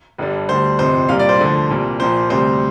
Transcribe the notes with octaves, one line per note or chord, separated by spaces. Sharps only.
G1 G2 D3 G3
D2 D3 G3 C5
G1 F2 C3 C5
C2 A#2 G3 F5
D5
C5
D2 D3 F3
C2 A#2 G3
A#1 A#2 F3 C5
D2 C3 G3 C5